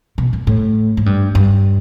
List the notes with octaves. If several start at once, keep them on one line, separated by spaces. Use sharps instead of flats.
B2
A#2
A2
G#2
G2
G2